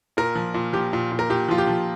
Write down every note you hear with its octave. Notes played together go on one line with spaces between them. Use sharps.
A#2 A#4
F3
A#2
F3 G4
A#2
A#2
A#4
A#2 G4
F3 F4
G4
F3